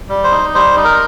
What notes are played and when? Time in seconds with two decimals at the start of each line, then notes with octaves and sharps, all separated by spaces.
0.09 G3
0.24 C5
0.31 D#4
0.54 G3 C5
0.77 D#4
0.84 A#4